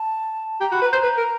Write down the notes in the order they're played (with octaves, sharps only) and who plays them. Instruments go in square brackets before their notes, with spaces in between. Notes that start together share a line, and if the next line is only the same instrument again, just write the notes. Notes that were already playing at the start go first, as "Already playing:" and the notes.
Already playing: [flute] A5
[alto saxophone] G4 [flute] A#5
[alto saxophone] F#4 [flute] B5
[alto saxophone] B4
[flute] A#5
[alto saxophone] C5
B4
A#4